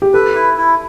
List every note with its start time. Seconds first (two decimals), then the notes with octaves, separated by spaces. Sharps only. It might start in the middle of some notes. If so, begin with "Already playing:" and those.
0.02 G4
0.14 A4 B4
0.35 E4
0.57 E4